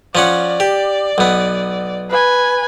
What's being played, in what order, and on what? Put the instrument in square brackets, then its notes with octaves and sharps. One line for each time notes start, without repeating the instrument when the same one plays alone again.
[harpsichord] F3 C#4 F#5 [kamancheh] D5
[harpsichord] G4
B1 B3
[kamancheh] B4 G#5